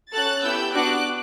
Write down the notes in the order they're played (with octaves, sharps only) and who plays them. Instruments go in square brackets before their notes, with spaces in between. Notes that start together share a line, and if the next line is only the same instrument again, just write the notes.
[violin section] C#4 F#4 A4 F#6 A6
B3 E4 G4 E6 G6
B3 D4 F#4 D6 F#6